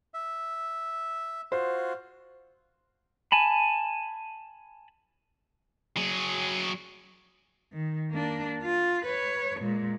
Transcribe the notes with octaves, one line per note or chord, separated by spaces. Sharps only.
E5
F4 F#4 C5
G#5 A5 B5
F#3 G#4
D#3
A#3 D4
F4
B4 C#5
A#2 G#3